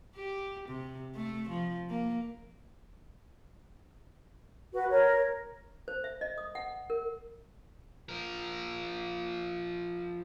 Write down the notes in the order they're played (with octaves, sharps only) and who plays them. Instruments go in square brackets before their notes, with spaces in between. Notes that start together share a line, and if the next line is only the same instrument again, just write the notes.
[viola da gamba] G4
C3
A3
F3
A#3
[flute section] F#4 B4
A#4 C#5
[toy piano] C5
E5
D#5
D#6
F#5
A#4
[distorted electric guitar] F3 A#4